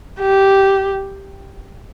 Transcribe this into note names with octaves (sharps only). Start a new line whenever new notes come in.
G4